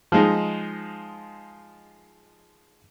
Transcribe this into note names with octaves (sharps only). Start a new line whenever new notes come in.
F3 G#3 D#4